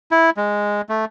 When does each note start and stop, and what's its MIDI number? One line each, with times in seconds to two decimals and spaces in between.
0.11 0.30 64
0.37 0.81 56
0.89 1.05 57